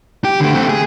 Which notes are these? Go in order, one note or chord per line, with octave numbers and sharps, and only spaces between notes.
G4
D3 A3
A3 C4
G#4